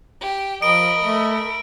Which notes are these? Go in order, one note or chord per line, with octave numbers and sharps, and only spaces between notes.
G4
F3 A#4 D#5 B5 D7
A3